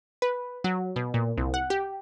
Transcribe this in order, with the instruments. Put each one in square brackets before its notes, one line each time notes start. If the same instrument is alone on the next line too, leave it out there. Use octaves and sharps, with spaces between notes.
[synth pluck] B4
F#3
B2
A#2
C2
F#5
G4